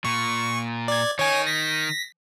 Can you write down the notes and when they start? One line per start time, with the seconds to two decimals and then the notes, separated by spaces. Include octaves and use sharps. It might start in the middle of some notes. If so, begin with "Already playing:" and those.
0.05 A#2 C#6
0.88 D5 G#6
1.19 D#3 C#5 G#5
1.47 A#6 B6